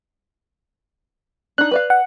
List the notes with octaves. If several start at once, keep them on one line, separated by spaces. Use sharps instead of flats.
D4 D#4 F#6
B4 D5 F5
F#5